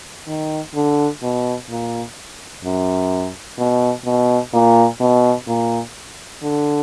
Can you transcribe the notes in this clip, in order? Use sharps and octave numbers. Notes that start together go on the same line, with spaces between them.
D#3
D3
B2
A#2
F#2
B2
B2
A#2
B2
A#2
D3